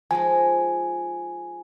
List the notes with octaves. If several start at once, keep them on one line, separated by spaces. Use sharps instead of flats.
F3 G#3 D#4 G#5